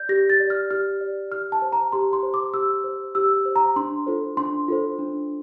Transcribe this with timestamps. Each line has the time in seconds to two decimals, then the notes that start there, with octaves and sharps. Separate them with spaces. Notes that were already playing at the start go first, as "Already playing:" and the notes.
Already playing: D5 G6
0.09 G4 A#6
0.30 A6
0.40 D5
0.50 F6
0.71 G4 F6
1.01 D5
1.32 G4 F6
1.52 A5
1.62 C5
1.72 A#5
1.92 G4 C6
2.13 C6
2.23 C5
2.34 D6
2.54 G4 E6
2.84 C5
3.15 G4 E6
3.45 C5
3.56 A#5
3.76 D4 C6
4.06 F4 A4 C5
4.37 D4 C6
4.68 F4 A4 C5
4.99 D4